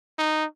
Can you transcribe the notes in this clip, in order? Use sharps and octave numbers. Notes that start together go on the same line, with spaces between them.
D#4